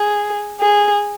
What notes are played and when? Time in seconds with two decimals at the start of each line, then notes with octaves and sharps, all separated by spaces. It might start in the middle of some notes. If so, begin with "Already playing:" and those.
Already playing: G#4
0.61 G#4